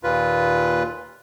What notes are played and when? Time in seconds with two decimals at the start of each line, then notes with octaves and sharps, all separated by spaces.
0.03 D#2 A#2 F4 B4